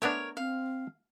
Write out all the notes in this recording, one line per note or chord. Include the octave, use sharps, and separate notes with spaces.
A3 B3 D4 A#4 C#5
C4 F5